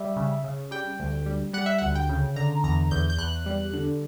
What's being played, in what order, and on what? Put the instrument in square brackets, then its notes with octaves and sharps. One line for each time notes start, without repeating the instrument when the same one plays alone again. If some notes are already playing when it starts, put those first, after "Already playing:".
Already playing: [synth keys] G3 E5
C#3
C#3
G3 G5
D2
G3
G3 F#5
E5
D2 F#5
G5
C#3
D3 A#5
E2 A#5
E2 G6
G6
E2 F#6
G3
D3